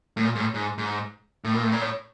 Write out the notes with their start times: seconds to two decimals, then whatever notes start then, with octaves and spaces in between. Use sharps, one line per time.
0.17 A2
0.25 A#2
0.35 G#2
0.40 A2
0.54 G#2
0.78 G#2
1.44 A2
1.54 A#2
1.63 A2
1.72 A#2
1.81 A2